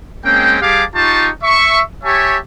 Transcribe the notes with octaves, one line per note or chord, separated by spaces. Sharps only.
G#3 A#3 C4 C#4 G5
G3 G4 G#4 F5 A5 D6
D#4 F4 G4 A5 C#6
E5 C#6
G4 C#5 E5 G#5 A5 C#6